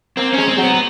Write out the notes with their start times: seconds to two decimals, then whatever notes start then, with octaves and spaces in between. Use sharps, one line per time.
0.17 A#3 C4
0.33 C#4
0.38 G#3
0.49 C4
0.58 F#3
0.63 B3
0.74 B3